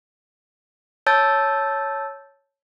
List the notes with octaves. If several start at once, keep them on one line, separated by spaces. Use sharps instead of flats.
C#5 A5 E6 G6 A6